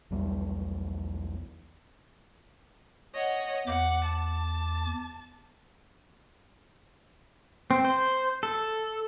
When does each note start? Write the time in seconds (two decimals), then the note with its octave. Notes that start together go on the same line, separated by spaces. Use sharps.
0.11 B1 E2 G3
3.13 C#5 D#5 F#5
3.67 E2 F#5 D6
4.06 A5
7.71 C4
7.85 C5
8.43 A4